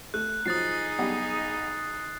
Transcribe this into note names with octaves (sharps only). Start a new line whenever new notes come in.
A3 F#6
F3 F#3 D#4 G#4 D#6 A6 C7
B1 G3 F#5